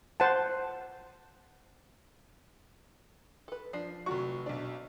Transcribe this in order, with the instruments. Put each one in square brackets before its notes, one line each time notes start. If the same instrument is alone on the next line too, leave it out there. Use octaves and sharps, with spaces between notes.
[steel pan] C5 F#5 A5
[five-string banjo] A4 B4
[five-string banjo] F3 D4 [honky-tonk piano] C7
[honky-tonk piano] F1 F#3 C#6 [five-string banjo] F#4
[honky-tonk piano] B1 D4